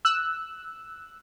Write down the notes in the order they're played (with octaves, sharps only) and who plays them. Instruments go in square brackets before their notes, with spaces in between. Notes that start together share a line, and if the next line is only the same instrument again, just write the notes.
[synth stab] E6 F#6